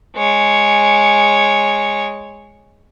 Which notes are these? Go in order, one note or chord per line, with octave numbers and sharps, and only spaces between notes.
G#3 C#5